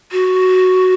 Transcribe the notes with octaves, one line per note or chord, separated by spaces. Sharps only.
F#4